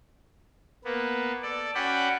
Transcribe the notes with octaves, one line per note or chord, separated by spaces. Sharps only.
A#3 B3
A4 D5
C#4 F#4 D5 F#5 G5 B5